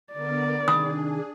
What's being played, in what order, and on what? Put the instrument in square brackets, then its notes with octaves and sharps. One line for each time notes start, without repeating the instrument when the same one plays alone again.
[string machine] D3 B3 A#4 [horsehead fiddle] D5
[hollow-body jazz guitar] C3 D#3 B5 [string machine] D4 G#4 [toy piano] D#6